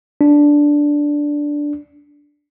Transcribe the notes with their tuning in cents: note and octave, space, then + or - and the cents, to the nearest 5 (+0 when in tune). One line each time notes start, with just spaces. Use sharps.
D4 -5